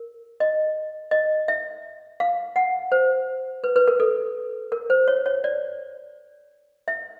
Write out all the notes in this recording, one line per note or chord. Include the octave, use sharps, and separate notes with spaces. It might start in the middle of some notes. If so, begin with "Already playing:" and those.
Already playing: A#4
D#5
D#5
E5
F5
F#5
C5
B4
B4
A#4
A4
A#4
C5
C#5
C#5
D5
E5